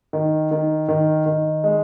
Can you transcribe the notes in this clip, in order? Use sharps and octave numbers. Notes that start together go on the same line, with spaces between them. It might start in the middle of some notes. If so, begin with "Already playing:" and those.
D#3
D#3
D#3
D#3
G#3